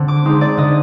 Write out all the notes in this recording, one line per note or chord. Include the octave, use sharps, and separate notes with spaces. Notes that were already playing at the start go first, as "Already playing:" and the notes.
Already playing: D3 C4
D6
G#3 C4 D#4
D5
D3 D#5